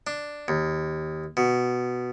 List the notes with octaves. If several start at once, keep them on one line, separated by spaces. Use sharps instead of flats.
D4
D#2
B2